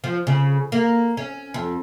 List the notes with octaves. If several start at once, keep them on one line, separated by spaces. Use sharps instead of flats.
F3
C#3
A#3
C#4
F2